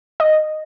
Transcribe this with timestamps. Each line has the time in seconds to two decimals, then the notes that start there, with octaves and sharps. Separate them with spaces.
0.20 D#5